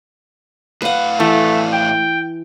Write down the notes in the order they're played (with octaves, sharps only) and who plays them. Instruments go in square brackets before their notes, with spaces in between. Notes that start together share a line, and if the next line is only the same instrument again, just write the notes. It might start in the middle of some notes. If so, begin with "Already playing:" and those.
[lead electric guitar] A2 F5 [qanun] B4 F#5
[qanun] E3 [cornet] A3
[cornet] G5